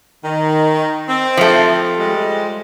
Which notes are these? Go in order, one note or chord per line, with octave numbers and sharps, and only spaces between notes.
D#3
C4
F3 A3
G3 G#3